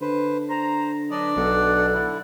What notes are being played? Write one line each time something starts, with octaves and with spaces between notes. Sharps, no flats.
D3 B4 C5
C5 A#5
F#3 D4 B4 D5 D#5
B1 A4 F#5
D3 E4